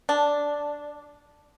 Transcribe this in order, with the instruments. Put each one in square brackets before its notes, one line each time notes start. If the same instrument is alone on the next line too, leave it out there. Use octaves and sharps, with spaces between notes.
[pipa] D4